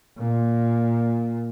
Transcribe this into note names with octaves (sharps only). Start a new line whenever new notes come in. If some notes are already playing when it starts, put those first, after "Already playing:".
A#2